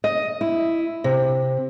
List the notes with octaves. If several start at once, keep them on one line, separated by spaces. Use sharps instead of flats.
D#5
E4
C3